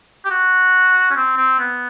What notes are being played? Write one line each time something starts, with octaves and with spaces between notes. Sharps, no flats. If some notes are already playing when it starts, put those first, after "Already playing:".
G4
F#4
C#4
C4
C4
B3